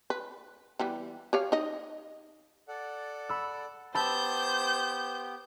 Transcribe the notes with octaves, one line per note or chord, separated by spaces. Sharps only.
B4
E3 G3 B3
G4 C#5 F5
D#4 D#5
A4 D5 F#5
B5 E6
B3 G4 C5 A5 B5 E6 G6